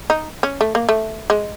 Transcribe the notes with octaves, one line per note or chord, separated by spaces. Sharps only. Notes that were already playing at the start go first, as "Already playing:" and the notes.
D#4
C#4
A3
A#3
A3
G#3